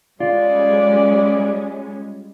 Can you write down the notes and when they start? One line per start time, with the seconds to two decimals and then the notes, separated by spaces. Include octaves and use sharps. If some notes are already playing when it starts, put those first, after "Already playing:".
0.20 G3 G#3 C#4 F4 D5